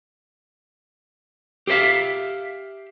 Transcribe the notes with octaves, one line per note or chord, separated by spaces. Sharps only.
G4 G#4 C5 E5 F5